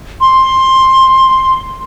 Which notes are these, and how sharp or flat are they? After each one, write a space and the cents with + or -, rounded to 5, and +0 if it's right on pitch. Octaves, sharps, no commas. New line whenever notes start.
C6 +10